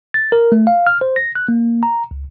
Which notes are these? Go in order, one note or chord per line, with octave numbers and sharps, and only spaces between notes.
A6
A#4
A3
F5
F6
C5
A#6
F#6
A#3
A#5
C#2